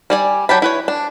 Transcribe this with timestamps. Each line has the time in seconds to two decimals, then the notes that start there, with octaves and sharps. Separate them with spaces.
0.10 G3 D5 G#5
0.49 F#3 G4 A5 B5
0.62 E4 B4 C#5
0.88 D4